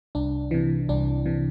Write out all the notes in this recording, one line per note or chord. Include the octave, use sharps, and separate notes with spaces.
C2 D4
C3 E3
C2 D4
C3 E3